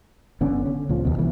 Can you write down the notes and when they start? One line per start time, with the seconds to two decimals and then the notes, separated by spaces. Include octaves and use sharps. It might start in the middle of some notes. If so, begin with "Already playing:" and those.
0.41 G1 D3 B3 C#4
0.65 D3 C#4
0.89 C#2 A#2 F3
1.05 D#2 B2
1.18 C2 E3 B3